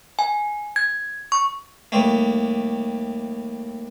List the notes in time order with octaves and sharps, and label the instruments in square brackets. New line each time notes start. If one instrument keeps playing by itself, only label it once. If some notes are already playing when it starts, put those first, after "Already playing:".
[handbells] G#5
G#6
C#6
[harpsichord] D#2 G3 A3